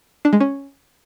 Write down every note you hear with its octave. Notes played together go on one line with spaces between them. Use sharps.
D4
G#3
C#4